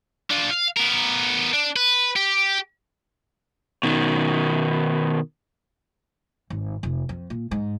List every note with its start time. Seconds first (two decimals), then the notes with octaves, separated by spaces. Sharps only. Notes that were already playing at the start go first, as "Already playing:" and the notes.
0.30 D4 F4
0.50 F5
0.77 B3 A#4
1.53 D4
1.76 B4
2.16 G4
3.83 B2 D#3
6.50 G#1
6.83 F1
7.09 F2
7.30 A#2
7.51 G#2